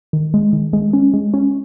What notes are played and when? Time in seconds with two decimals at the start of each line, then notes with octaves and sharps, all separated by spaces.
0.13 D#3
0.34 G#3
0.53 D#3
0.73 G#3
0.93 C#4
1.14 G#3
1.34 C#4